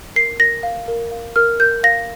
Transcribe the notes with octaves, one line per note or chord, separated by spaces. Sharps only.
A#4 C7
A#4 A#6
F5
A#4
F5
A#4 F6
A#4 G6
F5 A#6